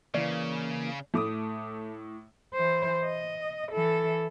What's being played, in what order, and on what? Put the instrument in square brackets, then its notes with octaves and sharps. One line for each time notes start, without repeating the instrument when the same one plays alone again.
[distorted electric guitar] C#3 [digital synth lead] E3 [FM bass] A#3 [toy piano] D5
[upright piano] A2 D6 D#6 [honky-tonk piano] A3
[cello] E3 C5
D#5
E3 A4